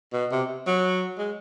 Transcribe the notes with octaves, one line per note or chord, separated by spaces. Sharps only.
B2
C3
F#3
G#3